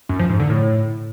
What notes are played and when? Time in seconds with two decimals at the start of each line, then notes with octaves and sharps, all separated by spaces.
0.09 F#2
0.19 F3
0.29 G#2
0.40 D3
0.50 A2